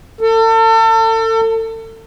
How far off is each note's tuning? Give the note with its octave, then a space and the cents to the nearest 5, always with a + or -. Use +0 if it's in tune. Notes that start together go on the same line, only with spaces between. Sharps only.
A4 +35